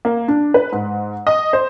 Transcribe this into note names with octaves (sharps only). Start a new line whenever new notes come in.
A#3
D4
B4
G#2
D#5
C5